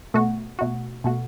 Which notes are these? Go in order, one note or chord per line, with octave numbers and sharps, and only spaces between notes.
B2 A3 F#4
B2 A3 F#4
B2 A3 F#4